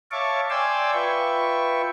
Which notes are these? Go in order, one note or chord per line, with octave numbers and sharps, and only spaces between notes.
C#5 E5 F5 A5 C#6 D6
D5 G5 G#5 C6 D6 E6
F4 B4 E5 G5 C#6